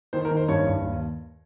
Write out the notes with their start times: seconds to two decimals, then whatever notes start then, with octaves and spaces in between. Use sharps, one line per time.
0.13 D#3 C5
0.25 A#4
0.31 D#3
0.37 C5
0.48 G2 C#5
0.67 G2
0.83 D#2